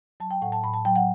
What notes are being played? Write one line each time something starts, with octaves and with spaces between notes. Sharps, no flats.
F#3 A5
G5
A2 F#5
A5
A2 B5
A5
F#3 G5
F#5